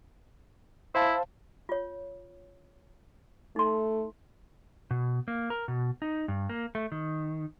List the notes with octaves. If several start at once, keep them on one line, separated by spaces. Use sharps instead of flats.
E4 C5 F5 A5
F4 C#5
A3 D#4 C6
B2
A#3
A#4
B2
D#4
G2
A#3
A3
D#3